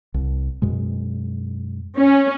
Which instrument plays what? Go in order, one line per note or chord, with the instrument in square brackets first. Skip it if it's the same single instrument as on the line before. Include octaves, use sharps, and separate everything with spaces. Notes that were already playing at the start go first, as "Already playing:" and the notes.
[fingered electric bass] C2
F#2 B2 G#3
[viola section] C#4